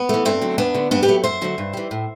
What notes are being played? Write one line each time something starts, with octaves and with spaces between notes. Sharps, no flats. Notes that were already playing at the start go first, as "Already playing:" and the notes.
Already playing: B3
E3 A3
G2 A3 C4
D3 F#3
E2 B3 D4
D3 A3
G2 B3 D4
G4 B4
F#3 A3
F#2 C5 E5
D3 F#3 A3
G2
E3 G3
A2